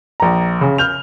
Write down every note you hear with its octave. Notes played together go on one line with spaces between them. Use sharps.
A#1 A#5
C#3
F6 G6 F7